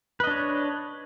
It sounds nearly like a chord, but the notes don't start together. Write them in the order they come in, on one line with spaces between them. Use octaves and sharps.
B4 D#5 D4 C#5